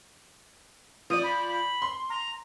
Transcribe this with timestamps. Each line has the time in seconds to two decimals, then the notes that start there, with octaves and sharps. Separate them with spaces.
1.10 F3 D5 D#6
1.23 B5
1.47 B5
1.82 C6
2.10 A#5